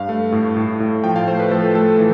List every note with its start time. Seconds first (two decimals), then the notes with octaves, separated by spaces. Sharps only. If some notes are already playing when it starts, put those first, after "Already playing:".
Already playing: G2 F5
0.09 A3
0.32 A2
0.57 A2
0.80 A2
1.04 F3 G5
1.16 F5
1.28 A3 C5
1.39 B4
1.51 F3 A4
1.75 A3 A4
1.99 E3